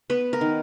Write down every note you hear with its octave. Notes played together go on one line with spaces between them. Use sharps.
B3 B4
A#4
D#3